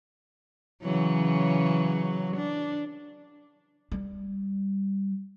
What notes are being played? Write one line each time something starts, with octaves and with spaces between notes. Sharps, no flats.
C#3 E3 F#3
D4
G3